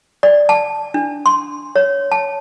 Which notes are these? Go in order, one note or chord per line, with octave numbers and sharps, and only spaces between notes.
D5
A5
D4
C6
C#5
A5